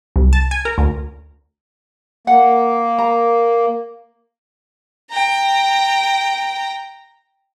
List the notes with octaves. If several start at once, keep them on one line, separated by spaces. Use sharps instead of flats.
C2
A5
G#5
A#4
D2
A#3 F#5
A#5
G5 A#5